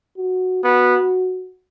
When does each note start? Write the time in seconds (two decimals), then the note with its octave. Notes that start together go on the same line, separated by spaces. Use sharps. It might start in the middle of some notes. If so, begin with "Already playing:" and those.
0.18 F#4
0.64 B3 F#4